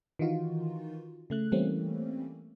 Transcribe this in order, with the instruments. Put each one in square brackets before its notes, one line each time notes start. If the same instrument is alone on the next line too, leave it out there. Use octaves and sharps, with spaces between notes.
[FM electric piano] D#3 E3 D#4 F4 F#4
C#3 A3 F#6
E3 G3 A3 A#3 C4 C#4